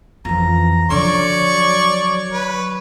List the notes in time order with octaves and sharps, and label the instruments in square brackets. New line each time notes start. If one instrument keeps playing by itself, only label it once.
[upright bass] F2 E3 [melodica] A#5
[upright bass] D3 F3 [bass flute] F#3 [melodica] C#5 [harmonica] D5 C#6
[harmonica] B4